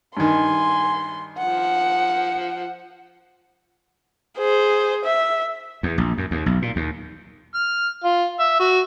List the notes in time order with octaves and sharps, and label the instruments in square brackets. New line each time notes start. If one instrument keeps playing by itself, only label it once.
[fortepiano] G2 D#3 [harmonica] G#5 [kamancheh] C6
[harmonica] F3 [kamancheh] F#5
[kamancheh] G#4 C5
E5
[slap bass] E2
A#1
F#2
D#2
B1
A#2
D#2
[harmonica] F6
F4
E5
F#4